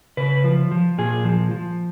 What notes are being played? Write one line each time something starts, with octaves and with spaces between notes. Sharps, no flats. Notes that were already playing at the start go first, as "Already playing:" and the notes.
C#3 B4
F3
F3
A#2 G#4
F3
F3